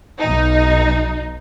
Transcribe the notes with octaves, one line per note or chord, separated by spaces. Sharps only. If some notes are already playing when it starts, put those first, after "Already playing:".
B1 D#4